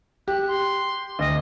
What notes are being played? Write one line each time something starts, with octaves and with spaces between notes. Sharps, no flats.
G4 F#6
C6
D2 D#5